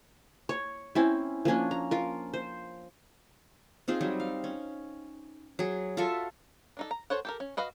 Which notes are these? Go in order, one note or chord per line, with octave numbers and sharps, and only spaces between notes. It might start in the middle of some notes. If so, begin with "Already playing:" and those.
C#5
C4 C#4 E4
F3 A#3 C#4 D4
A#5
F4 A#4
C5
C4 D#4 F4 G#4
F#3 G3 D#4
F5
C#4
F#3 G#4
F4 F#4 A4 E5
D4 D#4 A4
A#5
A4 C5 C#5 F#5
G4 A4 A#4
C#4
F#4 B4 D#5 F5